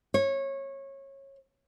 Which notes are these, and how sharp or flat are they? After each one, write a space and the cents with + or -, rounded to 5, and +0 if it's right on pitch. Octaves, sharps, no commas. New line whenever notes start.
C#5 -20